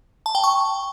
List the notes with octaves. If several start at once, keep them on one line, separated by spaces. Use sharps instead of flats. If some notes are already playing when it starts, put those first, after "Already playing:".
A5
G5
C#6